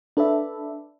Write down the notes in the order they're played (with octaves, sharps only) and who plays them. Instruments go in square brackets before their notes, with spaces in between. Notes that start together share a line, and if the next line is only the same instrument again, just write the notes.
[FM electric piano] D4 A4 B4 D5 E5